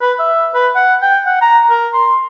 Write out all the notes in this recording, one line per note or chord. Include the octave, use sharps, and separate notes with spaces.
B4
E5
B4
F#5
G5
F#5
A#5
A#4
C6